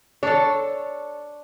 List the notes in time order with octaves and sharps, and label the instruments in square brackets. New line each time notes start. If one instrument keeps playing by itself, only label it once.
[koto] D4 A4 [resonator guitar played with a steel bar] C#5